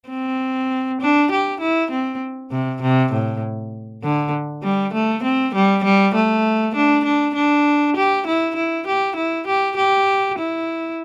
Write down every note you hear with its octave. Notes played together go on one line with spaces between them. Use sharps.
C4
D4
G4
E4
C4
C3
C3
A2
D3
G3
A3
C4
G3
G3
A3
D4
D4
D4
G4
E4
E4
G4
E4
G4
G4
E4